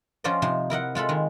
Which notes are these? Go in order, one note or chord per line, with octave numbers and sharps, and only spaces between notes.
F3 C#4 F4 C5 D5 D#5
C3 F3 D#4 C6
E4 A#4 D#5 F#5
G#3 F4 A4 B5
D#3 G#3